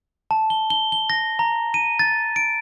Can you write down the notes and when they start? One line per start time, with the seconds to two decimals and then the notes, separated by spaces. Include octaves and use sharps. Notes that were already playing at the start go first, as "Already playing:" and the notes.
0.31 A5
0.50 G7
0.70 G7
0.92 G7
1.10 A#6
1.39 A#5
1.74 D#7
1.99 A6
2.36 D7